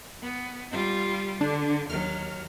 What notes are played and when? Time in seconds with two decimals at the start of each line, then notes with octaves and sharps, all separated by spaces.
0.21 B3
0.71 G3 F4
1.41 D3 D4
1.90 D#2 F#3 F6